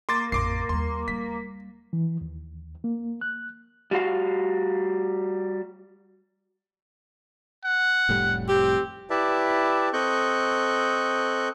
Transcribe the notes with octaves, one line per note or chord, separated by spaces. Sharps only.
A#3 C6 D6 A6
A1 F2 C6 D6 C7
D#2 G3 C6
G3 B6
E3
D#2
A#3
F#6
G3 F#4 F5
F#5
F1 A2 G3
C4 G4
E4 G4 B4 D5 E5 A5
C4 A4 D#5 C#6 F#6 G6